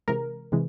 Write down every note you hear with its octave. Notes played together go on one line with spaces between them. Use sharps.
C3 E3 G#3 A#4
C3 E3 G#3